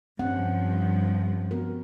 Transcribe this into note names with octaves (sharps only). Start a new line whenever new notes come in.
G2 F3 C4 C#4 F#5
B3 F#4 A#4